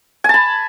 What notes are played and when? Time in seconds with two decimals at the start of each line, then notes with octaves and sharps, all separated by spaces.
0.24 G#5
0.29 A5
0.34 B5